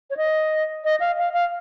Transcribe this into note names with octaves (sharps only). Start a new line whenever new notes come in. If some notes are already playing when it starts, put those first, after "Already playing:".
C#5
D#5
D#5
F5
F5
F5